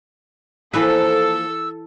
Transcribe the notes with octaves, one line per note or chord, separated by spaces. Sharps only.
E3 F3 A#3 A4 B4 E6